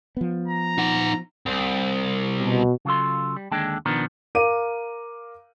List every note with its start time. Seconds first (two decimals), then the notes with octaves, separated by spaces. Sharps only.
0.17 F3 B3
0.48 A#5
0.78 D#4 F#5
1.46 C2
2.41 B2
2.85 C#3 F#3 F4 A4 C6
3.36 G3
3.51 D#2 D3 G#3 D4 G5 A5
3.86 B2 D#3 F3 B3 D4 A#4
4.35 A#4 F5 D6 D#7